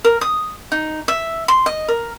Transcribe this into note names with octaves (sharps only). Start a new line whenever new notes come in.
A#4
D#6
D#4
E5
C6
D#5
A#4